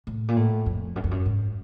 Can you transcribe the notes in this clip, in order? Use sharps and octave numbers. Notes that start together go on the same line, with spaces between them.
A2
A#2
A2
F2
F#2
F2
F#2
G#2